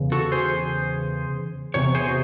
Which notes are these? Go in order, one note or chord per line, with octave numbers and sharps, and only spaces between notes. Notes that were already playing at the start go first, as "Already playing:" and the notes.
Already playing: E2 C#3
F#4 A4
G#4 C5
E2 C3 C#5
G#4 C5
F#4